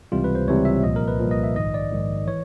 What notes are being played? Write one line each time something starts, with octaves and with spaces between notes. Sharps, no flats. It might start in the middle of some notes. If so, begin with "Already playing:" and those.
C#2 C3 E3 G3 F4
B4
C5
C#2 C3 E3 G3 C#5
E5
C2 A#2 F3 D#5
A#4
B4
C2 A#2 F3
D#5
E5
A#1 G#2 D#3 D#5
D5
A#1 G#2 D#3
E3 C#5